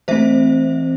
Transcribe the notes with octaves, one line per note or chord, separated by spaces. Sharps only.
E3 A3 C4 C5 E5